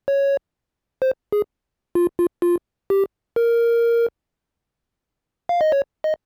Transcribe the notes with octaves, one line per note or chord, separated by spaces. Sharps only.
C#5
C5
G#4
F4
F4
F4
G4
A#4
F5
D#5
C#5
D#5